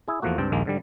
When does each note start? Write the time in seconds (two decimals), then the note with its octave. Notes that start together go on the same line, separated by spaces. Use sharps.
0.08 E4 G#4
0.22 E2 F3 A3 A#3 F#4
0.38 C#2 G2 C4 G5 A5
0.52 A#1 D#2 G#3 A#3
0.65 G#2 D3 G3